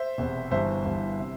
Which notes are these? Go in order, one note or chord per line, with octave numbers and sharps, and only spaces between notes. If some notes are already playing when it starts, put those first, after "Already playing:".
Already playing: C5 E5
E1 E2 C3
G1 G2 E3 C5 E5
G1 G2 E3
C3